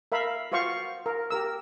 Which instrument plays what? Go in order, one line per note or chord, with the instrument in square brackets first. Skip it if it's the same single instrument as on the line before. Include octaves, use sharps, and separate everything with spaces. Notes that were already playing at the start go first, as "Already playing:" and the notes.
[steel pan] A#4 E5 F5 B5
F4 F#4 C5 F5 C#6
A#4
G4 A#4 E6